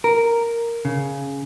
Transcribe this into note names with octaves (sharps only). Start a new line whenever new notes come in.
A#4
C#3